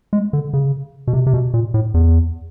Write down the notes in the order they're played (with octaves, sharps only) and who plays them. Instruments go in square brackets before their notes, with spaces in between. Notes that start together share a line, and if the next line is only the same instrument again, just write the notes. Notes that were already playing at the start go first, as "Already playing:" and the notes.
[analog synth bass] G#3
D3
C#3
B2
C3
C3
B2
A#2
A2
E2